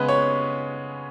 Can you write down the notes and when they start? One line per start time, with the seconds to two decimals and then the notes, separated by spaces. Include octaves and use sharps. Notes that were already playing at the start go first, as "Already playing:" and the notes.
Already playing: C#3 G#3 B3 B4
0.09 C#5